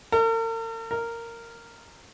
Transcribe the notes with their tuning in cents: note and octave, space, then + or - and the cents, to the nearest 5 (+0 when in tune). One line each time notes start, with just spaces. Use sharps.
A#4 -45
A#4 -10